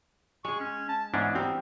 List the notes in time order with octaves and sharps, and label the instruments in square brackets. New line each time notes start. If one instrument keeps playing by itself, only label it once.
[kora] G#3 G#4 [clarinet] C#6
[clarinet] C#4
A5
[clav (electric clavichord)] G#2 C#4 D4 [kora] E3 E4 [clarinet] B3
[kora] G3 G4 A#4 [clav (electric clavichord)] C4